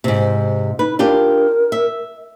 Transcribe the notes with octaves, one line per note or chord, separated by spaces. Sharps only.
G#2 C3
D#4 B4
D4 F4 G4 A#4
E5